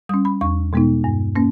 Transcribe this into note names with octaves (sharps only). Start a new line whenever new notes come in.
G3 C#4 D#6
B5
E2 C#6
B2 G#3 B3 D#4
G2
A#3 C#4